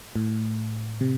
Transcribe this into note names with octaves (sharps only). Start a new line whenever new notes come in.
A2
C3